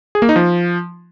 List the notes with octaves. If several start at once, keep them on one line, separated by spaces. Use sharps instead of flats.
G#4
A#3
D#4
F3